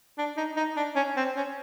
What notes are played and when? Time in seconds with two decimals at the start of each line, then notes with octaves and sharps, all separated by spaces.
0.18 D4
0.37 D#4
0.57 D#4
0.76 D4
0.96 C#4
1.17 C4
1.36 C#4